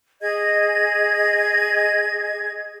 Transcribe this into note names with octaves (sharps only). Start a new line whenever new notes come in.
G#4 D#5 G#6